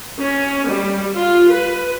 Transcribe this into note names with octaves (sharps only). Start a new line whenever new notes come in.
C#4
G3
F4
B4